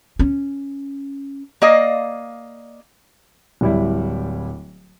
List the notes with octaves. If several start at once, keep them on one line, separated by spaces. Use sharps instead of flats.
C#4
A#3 D5 D#5 F5
D1 G3 E4